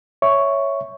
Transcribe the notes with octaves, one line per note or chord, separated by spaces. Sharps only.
C#5 E5 C#6